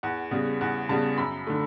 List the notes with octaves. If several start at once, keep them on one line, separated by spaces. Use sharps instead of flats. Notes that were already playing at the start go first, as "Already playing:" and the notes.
E2 F#5
C#3 G3 B3
E2 F#5
C#3 G3 B3 A5
F#2 B5
D3 A3